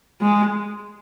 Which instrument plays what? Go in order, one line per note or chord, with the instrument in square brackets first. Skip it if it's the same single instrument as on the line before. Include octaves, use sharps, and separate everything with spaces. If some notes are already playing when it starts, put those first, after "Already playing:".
[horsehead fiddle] G#3